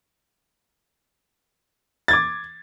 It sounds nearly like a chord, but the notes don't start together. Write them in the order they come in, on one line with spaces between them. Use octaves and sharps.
A6 G#6 D6